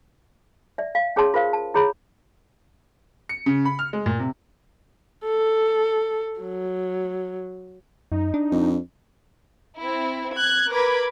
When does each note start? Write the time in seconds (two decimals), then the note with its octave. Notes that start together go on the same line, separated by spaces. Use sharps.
0.78 D5 E5
0.95 F5
1.16 C#4 G#4 C#5 A5 C6
1.34 F4 A#4 C5 F5
1.53 A5
1.74 E4 G#4 C#5 B5
3.29 C#7
3.46 C#3
3.65 B5
3.79 F6
3.93 G#3
4.06 A#2
4.19 C3
5.26 A4
6.41 F#3
8.12 F#2 D#4
8.34 D4
8.52 F2
9.80 C4 E4
10.36 F#6 G#6
10.70 A#4 B4 B5 D6 G#6